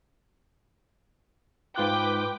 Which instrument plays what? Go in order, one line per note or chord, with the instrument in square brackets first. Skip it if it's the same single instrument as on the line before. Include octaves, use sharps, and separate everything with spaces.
[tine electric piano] G#2 F4 F#6 [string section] B4 G5 D6